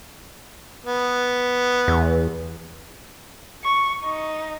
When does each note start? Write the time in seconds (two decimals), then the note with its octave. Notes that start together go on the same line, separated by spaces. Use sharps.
0.86 B3
1.88 E2
3.64 C#6
4.03 D#4